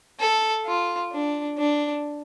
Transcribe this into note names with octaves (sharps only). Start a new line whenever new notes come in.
A4
F4
D4
D4